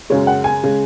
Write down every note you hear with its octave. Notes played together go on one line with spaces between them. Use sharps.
F#2 C#3 G#3 C#5
F#5
G#5
C#3 G#3